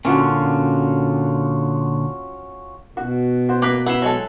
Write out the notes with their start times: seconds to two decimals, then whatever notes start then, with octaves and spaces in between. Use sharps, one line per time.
0.05 A#2 D3 C#4 F4 F#4
2.97 B2 F#4
3.49 F#4 C5
3.62 A#3 B4 D6 F#6 B6
3.86 B3 E4 C7 E7
4.02 F#3 G#3 A4